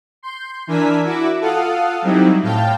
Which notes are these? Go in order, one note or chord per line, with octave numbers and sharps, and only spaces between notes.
C6 G6
E3 D4 A#4 G#5 E6 B6
E4 F#4 E5 D6
F4 A4 F5 F#5 D#6
F#3 G3 C4 D#4 E4
A2 F5 G5 A5 G6